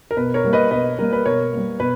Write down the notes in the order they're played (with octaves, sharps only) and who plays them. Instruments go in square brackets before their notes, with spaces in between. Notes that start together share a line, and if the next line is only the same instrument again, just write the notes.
[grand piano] A#4
[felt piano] B2 [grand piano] B4
[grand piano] A#4 C#5
[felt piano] G3 A#3
[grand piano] B4 D#5
[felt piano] B2 [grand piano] B4 D#5
[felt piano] G3 A#3 [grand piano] A#4
[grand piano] B4
[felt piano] B2 [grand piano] A#4 C#5
[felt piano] G3 A#3
[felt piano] B2 [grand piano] B4